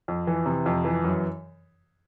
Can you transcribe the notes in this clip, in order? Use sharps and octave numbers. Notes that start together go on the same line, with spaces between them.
F2
E3
C3
F2
E3
F#2